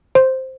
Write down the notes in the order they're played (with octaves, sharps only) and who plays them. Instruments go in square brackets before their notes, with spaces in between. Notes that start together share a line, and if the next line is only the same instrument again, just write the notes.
[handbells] C5